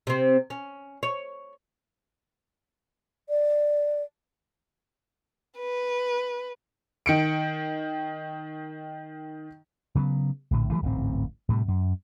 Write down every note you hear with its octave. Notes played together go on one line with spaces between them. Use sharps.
C3 C4
C#4
C#5
D5
B4
D#3 C#7 D7
C#3 F#3 A3 B3
A#1 A2 D3
E3 F#3 G3 A3
D1 A1 G#2 C4
A2 C3 D#3 G3
F#2